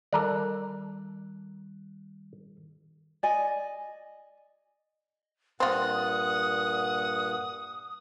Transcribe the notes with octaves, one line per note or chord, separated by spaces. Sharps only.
D#3 G3 A4 A#4 D5 F#6
D5 D#5 G#5
G2 A#2 C4 F4 F#5 D#6